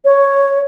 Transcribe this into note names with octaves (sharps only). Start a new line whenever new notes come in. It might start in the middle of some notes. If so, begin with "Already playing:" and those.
C#5